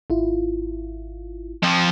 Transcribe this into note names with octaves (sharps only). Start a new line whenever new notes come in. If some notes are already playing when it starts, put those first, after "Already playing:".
G#1 E4 F4
F2 F3